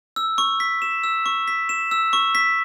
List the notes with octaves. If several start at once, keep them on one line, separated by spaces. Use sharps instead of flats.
E6
C#6
B6
E7
E6
C#6
B6
E7
E6
C#6
B6